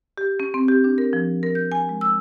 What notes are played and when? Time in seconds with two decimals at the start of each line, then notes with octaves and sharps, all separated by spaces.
0.18 G4
0.40 C#4
0.54 C4
0.68 G4
0.84 D4
0.98 A#4
1.13 F3
1.43 A#4
1.55 G6
1.72 G#5
1.89 G#3
2.01 E6